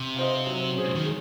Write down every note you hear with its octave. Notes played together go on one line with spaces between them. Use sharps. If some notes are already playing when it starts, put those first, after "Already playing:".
Already playing: C3
F4 C5 D#5
F#3
C#4 G#4 C5
D#3
G#3